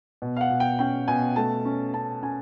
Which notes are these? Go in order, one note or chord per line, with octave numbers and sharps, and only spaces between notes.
B2
F5
F#5
B2
G5
C#4 G5
B2 G#5
A3 A5
C#4
C#4 A5
C#4 G#5